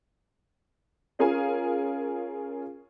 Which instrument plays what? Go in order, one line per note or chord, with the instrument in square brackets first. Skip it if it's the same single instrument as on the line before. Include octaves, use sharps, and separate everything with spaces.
[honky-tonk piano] C#4 F4 G#4 A#4 F5 G#5